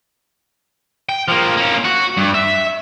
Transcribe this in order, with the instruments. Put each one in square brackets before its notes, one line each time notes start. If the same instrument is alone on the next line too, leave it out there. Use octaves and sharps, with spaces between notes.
[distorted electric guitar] G5
F3 A#3
A#3 C#4
F#4
G2
E5